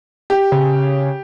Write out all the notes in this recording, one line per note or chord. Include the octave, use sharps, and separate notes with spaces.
G4
C#3